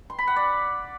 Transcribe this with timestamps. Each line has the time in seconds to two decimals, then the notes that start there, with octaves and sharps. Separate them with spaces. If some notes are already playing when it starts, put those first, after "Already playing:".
0.10 C6
0.19 B5
0.27 F#5
0.36 D5